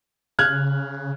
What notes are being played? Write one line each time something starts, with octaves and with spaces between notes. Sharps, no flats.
C#3 F6 F#6 G#6